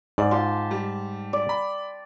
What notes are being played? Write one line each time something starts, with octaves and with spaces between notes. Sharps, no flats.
G#2 D5
F4 G4 A5 C6
G3
D5
B5